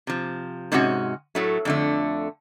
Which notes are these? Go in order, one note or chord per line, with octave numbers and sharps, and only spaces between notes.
C3 F3
G#2 C3 G#3 C#4 F#4
A2 F#3 A3
F2 D3 A3